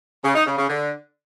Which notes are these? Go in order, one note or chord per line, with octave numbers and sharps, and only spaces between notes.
C#3
D#4
C#3
C#3
D3